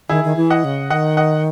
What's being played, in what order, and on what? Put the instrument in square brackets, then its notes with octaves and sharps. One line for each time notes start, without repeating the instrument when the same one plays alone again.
[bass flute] D#3 [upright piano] E4 G#4
[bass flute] D#3
E3
[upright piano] D#5 F#5
[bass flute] C#3
[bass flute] D#3 [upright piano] D#5 F#5
[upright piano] D#5 F#5